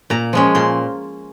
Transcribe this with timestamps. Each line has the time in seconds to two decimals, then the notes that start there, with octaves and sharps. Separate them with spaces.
0.10 A#2 A#5
0.33 F3 G#3 C#4
0.55 A#2 C6